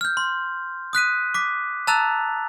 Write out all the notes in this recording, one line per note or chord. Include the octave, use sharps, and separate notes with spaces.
F6 G6
C6
D#6 F#6 B6 D#7
D6 B6
A5 A#5 E6 F#6 A6 F7